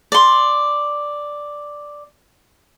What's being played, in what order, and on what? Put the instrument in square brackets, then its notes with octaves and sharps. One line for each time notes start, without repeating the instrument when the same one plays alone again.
[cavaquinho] D5 C6